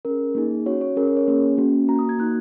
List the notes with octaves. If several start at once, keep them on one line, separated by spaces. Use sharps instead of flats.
C#4 G#4 A#4
A#3 D#4 G#4
C#4 F#4 C#5
C#5
C#4 G#4 A#4
A#4
C#5
A#3 C#4 G#4
A#3 C#4 F#4
A#3 F#4 A#5
D#6
G#6
A#3 D#4 F#4 F#6